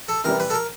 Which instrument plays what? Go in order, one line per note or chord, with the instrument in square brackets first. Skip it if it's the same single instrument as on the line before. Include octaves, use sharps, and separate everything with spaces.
[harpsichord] A4
[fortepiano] C3 E3 G3 [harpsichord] A#4
[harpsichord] B4
A4
A#4